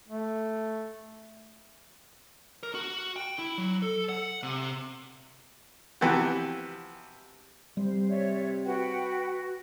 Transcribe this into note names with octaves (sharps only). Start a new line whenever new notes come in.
A3
A#4
F#4
G5
E4
F#3
A4
F#5
C3
C3 E3 F3 F#4 G4
C3 G3 C5
C#5 D5 E5
F#4 B4 F#5 G5